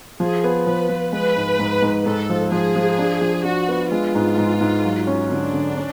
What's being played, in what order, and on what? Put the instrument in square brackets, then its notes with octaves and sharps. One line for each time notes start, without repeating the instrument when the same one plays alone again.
[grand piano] F3 [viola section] G#4
[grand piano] B3
[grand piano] F3 [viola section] B4
[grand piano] F3
[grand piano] G#3 [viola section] B4
[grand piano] G#2
G#2
G#2
[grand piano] G#2 [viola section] A4
[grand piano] F3
[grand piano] F3 [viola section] G#4
[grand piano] F3
D4
F3
[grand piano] D4 [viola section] F#4
[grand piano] B3
[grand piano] G#3 [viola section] F4
[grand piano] G#2
G#2
G#2
F#3
C#4
[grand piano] D3 [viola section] D4
[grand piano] D3
C#4